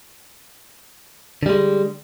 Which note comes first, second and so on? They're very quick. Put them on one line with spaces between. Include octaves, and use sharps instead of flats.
D3 G3 G#3